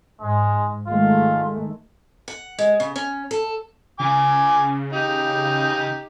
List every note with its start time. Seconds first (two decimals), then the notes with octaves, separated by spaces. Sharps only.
0.21 G#2 G#3
0.87 D#3 G#3 A3 F4
2.28 F#5
2.59 G#3
2.80 C#3
2.96 C#4
3.31 A4
4.00 C#3 G#5 D6
4.93 D#4 G4